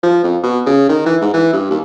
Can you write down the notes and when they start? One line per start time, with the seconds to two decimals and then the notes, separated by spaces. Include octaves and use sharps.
0.03 F3
0.24 F2
0.43 B2
0.66 C#3
0.89 D#3
1.06 E3
1.21 G#2
1.34 E3
1.53 G2
1.71 D#2